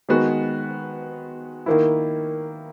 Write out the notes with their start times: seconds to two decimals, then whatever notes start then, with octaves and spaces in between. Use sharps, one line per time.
0.09 D#3 G#3 B3 F#4
1.66 D#3 A#3 E4